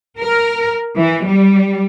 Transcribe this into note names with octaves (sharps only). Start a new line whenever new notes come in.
A#4
E3
G3